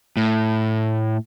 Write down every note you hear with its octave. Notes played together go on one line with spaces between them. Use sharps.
A2